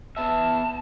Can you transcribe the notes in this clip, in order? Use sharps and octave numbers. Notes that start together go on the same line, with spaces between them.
B3 E5 A5